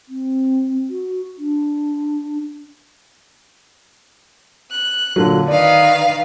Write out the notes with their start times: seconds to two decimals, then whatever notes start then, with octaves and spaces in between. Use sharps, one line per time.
0.09 C4
0.90 F#4
1.38 D4
4.71 F#6
5.16 A#2 D3 F#3
5.48 D#3 B4 D5 F5